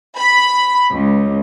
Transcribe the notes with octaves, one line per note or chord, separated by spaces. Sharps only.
B5
C#2